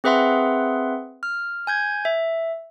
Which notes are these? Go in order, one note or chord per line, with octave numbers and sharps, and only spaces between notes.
C4 G#4 B4 E5 F#5 C6
F6
G#5 G6 G#6
E5